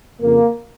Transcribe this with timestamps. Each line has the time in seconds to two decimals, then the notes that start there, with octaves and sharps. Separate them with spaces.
0.21 F2 C#3 A#3